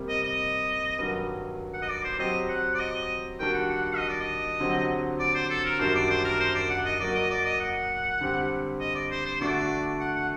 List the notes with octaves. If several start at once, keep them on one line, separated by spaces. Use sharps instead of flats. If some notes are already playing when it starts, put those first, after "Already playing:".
Already playing: C3 G3 A#3
D#5
D#5
G2 D#3 F#3
F#5
D#5
D5
C5
F#3 C4 G4 D#5
F#5
D5
D#5
D#3 G3 D4 F#4 G5
F#5
F#5
F#5
D#5
D5
D#5
D3 F#3 C4 G4
D5
C5
A4
A#4
F#2 D#3 G3 D4 F#4 C5
D5
C5
A#4
C5
D5
F#5
D#5
F#3 A#3 F#4 D5
D#5
D5
D#5
F#5
D3 G3 C4 G4
D#5
D5
C5
C5
D3 A3 D4 F#4 D5
F#5
F#5